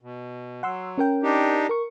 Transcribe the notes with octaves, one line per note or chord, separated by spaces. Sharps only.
B2
F#3 F#5 C6 E6
C#4 A#4 G5
D4 D#4 G4
A#4 C#6